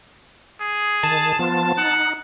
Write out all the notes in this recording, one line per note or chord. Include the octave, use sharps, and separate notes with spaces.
G#4
D#3 A5
F3 B3 F4
D#4 F#5